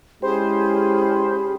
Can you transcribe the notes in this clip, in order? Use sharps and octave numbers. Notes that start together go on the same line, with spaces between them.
G#3 C#4 E4 G4 G#4 C5 B5